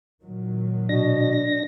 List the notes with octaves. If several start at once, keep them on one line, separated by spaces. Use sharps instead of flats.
A#2 D#3 F#3
B2 D4 A#6